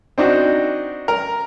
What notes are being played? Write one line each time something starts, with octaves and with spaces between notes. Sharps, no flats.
C4 D4 D#4 F#4
A#4